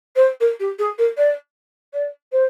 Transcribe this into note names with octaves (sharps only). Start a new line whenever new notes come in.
C5
A#4
G4
G#4
A#4
D5
D5
C5